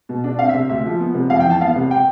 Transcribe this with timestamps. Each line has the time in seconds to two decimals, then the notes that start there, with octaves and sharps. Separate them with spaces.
0.09 B2
0.24 D4
0.39 C4 F5
0.49 E5
0.54 C3
0.69 D2 E5
0.85 F3
1.00 B3
1.14 C3
1.30 F2 F5
1.40 G5
1.45 E3
1.50 A5
1.61 B3 F5
1.76 C3
1.91 G5